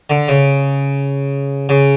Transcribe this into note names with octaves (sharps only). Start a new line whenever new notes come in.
D3
C#3
C#3